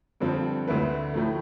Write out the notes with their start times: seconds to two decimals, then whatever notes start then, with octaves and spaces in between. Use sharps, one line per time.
0.20 G2 D3 F3 C4
0.68 D2 D3 A3 E4 B4
1.14 A2 F3 A3